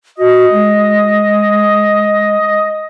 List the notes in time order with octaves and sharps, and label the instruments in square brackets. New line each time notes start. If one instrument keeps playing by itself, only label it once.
[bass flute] F#4 [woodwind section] D#5
[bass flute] G#3